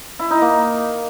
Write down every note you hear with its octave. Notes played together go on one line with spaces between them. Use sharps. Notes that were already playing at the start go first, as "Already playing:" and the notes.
E4
D#4
A#3